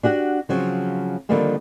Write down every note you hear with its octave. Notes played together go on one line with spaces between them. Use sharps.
D4 F#4 G4 F#5
C#3 F3 F#3 C4
D3 D#3 F3 G3 A#3 C4